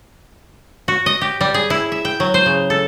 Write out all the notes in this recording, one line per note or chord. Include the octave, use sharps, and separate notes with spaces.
F#4
D#5
G4
G3
G#4
E4
E5
G5
F#3
C5
C#3
A4